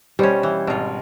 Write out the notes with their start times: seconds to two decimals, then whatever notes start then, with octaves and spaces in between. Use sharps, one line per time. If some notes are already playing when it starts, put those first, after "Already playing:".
0.19 B2 G3 C#4 C5 C#5
0.43 E3
0.67 G#1 B2 F4